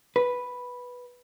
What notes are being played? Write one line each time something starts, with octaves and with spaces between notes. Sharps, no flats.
B4